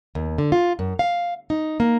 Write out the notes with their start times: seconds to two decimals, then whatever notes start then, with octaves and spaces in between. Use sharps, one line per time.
0.15 D#2
0.38 D3
0.52 F4
0.79 F#2
0.99 F5
1.50 D#4
1.80 A#3